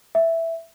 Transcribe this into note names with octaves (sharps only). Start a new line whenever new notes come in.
E5